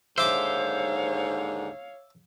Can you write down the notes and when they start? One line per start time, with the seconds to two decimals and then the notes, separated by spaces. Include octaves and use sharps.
0.18 D#2 G#2 D3 C5 C#5 E5 F5 D6